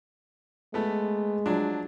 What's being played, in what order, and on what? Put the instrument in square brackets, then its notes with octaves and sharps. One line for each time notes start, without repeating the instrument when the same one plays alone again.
[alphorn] G#3 [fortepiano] A3 B3
[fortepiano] F3 F#3 D4